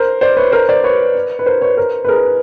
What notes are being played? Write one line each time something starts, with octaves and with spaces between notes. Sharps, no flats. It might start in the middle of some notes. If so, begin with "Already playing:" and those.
Already playing: A#4 C5
C5 D5
B4 C#5
A#4 C5
C5 D5
B4 C#5
B4
A#4 C5
B4 C#5
A#4 C5
B4
G#4 A#4